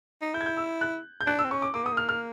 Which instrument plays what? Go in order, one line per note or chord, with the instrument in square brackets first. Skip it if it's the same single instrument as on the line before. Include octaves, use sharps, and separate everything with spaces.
[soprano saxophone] D#4
[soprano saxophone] E4 [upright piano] G6
[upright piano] G#6
G6
E6
F#6
G6
[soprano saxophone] D4 [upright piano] F#6
[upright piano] E6
[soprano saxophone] C4
[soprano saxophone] C#4 [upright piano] C#6
[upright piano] D6
[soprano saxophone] A#3 [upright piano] D6
[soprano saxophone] B3 [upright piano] D#6
[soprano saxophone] A#3
[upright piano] F6
F6